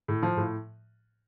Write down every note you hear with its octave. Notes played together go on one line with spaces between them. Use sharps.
A2
F3
A2